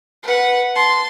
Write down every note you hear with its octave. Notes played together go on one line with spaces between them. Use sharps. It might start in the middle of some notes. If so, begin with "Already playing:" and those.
B4 F#5
A5 C6